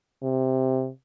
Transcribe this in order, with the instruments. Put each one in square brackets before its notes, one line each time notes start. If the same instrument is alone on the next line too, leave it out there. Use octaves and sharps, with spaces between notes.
[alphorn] C3